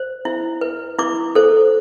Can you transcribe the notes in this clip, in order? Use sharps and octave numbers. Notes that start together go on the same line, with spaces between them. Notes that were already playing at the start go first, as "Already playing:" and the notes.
Already playing: C5
E4
B4
E4 D6
A4 C5